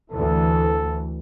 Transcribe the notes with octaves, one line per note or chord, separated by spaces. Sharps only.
D2 E3 A4